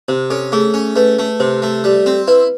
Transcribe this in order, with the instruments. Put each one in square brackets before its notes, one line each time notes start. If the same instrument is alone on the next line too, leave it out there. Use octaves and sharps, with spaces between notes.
[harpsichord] C3 [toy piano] C5
[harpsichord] C#4 [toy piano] A4
[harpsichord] A3 [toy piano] G#4
[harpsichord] C#4
[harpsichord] A3 [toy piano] B4
[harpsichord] A3
[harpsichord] C3 [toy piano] C5
[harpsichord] A3
G3
C4
[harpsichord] E4 [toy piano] B4